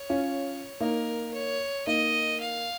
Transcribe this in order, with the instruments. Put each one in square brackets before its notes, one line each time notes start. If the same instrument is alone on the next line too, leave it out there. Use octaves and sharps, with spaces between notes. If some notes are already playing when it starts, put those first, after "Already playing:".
Already playing: [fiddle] C#5
[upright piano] C#4 F4
[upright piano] A#3 D#4 [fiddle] A#4
[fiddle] C#5
[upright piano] A#3 D#4 [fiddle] D#5
[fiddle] F5